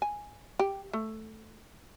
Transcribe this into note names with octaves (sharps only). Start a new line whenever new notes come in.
G#5
G4
A3